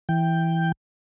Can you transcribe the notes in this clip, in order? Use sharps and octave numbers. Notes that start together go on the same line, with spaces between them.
E3 G5